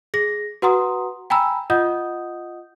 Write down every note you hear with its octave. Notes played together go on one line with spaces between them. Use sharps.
G#4 A#6
F#4 B4 F#5 A#5 C6 D#6
G5 G#5 A#5 B5 E6
F4 D#5 F#5 D#6 G6